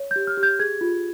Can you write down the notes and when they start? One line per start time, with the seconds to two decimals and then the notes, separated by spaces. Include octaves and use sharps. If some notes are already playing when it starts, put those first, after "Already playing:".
Already playing: C#5
0.11 G6
0.16 G4
0.27 F6
0.37 G4
0.43 G6
0.59 G#4 G#6
0.81 F4